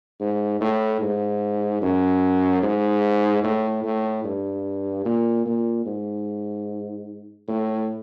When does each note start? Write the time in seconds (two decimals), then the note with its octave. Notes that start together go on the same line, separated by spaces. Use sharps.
0.20 G#2
0.61 A2
1.01 G#2
1.82 F#2
2.63 G#2
3.44 A2
3.84 A2
4.24 G2
5.05 A#2
5.46 A#2
5.86 G#2
7.48 A2